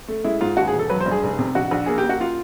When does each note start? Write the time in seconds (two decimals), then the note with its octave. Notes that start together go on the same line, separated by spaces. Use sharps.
0.08 A3
0.24 G#3 E4
0.41 G#2 F4
0.57 D#2 F#4
0.68 G#4
0.73 E1
0.79 A4
0.90 F#3 B4
1.00 C5
1.06 G2
1.11 G#4
1.23 F1
1.39 C3
1.55 A#1 F#4
1.71 A#1
1.86 A#3 G#4
1.98 G4
2.04 A#3
2.09 F#4
2.21 F4